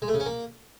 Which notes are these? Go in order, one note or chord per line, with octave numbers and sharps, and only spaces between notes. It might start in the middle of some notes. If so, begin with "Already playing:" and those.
G#3
A3
C#3
C#4
A#3